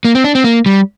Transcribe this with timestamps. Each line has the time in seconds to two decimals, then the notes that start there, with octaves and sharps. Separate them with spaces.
0.05 A#3
0.15 C4
0.24 D4
0.35 C4
0.44 A#3
0.66 G3